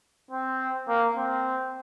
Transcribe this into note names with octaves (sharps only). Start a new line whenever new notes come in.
C4
A#3
C4